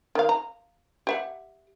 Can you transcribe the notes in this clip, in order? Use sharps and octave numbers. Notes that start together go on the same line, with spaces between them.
D#3 F5
A#5
G4 E5 F#5